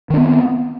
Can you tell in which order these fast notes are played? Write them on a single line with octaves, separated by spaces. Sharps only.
D#3 D4 B3 C4